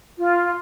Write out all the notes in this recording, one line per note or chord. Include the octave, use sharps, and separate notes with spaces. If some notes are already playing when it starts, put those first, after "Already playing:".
F4